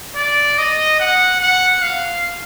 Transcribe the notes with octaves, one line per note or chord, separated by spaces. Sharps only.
D5
D#5
F#5
F#5
F5